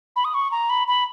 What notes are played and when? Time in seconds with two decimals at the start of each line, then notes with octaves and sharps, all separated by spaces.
0.16 B5
0.25 D#6
0.34 C#6
0.51 A#5
0.70 B5
0.88 B5